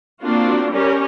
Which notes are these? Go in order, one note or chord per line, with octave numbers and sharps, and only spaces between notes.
A#3 C4 D4 F4 F#4
G3 C#4 G4 A#4 C#5